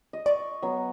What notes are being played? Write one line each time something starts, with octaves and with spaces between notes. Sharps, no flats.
D#5
D5 C#6
F#3 B3